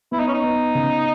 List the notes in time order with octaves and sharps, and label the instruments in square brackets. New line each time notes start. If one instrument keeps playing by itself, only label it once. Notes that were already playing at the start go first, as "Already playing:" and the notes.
[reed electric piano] B3 [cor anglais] E4
[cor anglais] D#4
C#4
D#4
[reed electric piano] B3
C#3